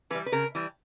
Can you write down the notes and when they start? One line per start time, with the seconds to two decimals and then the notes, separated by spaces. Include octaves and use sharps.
0.10 E3 B4
0.15 G3
0.26 B4
0.32 C#3 A#4
0.55 E3 G3